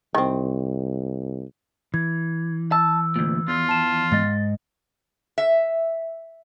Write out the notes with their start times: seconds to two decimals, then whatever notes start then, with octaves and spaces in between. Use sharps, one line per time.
0.15 C2 D#3 C4
1.94 E3 G#6
2.72 A5 E6
3.16 D2 A#2
3.48 E2 F4
3.69 A5 E7
4.12 G#2 G#3 D#5 A6
5.38 E5